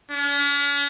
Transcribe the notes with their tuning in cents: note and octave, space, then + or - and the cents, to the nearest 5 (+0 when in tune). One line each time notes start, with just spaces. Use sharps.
C#4 +45